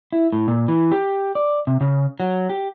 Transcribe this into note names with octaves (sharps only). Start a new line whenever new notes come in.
E4
A2
A#2
E3
G4
D5
C3
C#3
F#3
G4